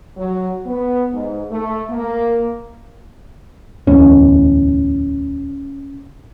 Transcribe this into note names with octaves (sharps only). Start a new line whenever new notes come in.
F#3
B3
G#2
A3
A#3
D1 E2 A2 C#4